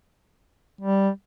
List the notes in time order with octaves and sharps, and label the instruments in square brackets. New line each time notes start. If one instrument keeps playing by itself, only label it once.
[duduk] G3